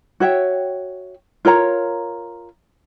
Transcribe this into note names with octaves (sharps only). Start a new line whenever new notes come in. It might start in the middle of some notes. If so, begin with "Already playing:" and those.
F#4 C#5 E5 G5
F4 A#4 C#5 A#5